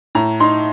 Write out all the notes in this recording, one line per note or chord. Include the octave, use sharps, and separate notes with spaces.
A2 A#5
D#4 C6